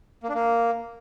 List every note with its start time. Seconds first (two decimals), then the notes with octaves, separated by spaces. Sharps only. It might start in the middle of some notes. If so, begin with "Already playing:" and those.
0.23 A#3
0.29 D4
0.35 A#3